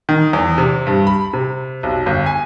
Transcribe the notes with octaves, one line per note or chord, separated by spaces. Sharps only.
D#3
E2
C3
G2
B5
C3
B1
G1
G#5